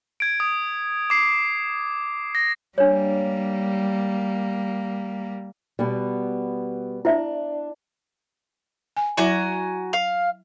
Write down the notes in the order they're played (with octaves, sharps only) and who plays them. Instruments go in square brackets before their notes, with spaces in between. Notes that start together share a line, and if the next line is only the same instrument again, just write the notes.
[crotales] G#6 D7
D#6
D6 C7
A#6
[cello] G3 A#3 [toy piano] D4 C#5
[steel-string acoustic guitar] B2 G3 B3
[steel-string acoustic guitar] D4 [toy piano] E4 C5 E5
[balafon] G#5
[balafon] F#3 E4 E5 [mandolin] F#4 G#5 A#5
[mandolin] F5